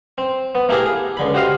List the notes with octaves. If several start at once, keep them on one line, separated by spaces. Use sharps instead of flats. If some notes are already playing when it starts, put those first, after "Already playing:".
C4
B3
A3 A#3 E4 G4 G#4 A#4
G#4
C#2 D3 B5
F#4 G4 C5 D#5 F5